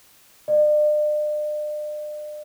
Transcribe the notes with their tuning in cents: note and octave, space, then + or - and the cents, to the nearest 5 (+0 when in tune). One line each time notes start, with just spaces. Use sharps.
D5 +40